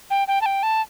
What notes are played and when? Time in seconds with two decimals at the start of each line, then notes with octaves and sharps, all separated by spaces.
0.11 G5
0.28 G5
0.41 A5
0.46 G5
0.63 A5